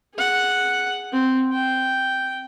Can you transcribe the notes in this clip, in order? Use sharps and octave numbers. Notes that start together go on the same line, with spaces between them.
G#4 F#5
C4
G5